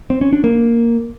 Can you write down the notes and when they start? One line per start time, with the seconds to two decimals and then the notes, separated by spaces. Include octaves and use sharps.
0.10 C4
0.21 C#4
0.33 D4
0.44 A#3